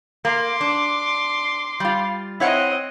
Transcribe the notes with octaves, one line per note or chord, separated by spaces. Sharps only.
A#3 C6 D6
D4
G3 F4
C4 E4 C#5 D#5 F#5